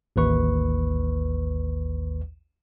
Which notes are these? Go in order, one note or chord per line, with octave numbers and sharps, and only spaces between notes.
A1 D#2 B4 C#6